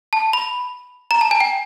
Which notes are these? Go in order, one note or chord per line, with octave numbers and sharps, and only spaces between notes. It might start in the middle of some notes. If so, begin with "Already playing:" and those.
A5
B5
A#5
A5
G#5
G5